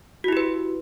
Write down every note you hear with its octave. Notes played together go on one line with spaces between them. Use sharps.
E4 F#4 G4 B4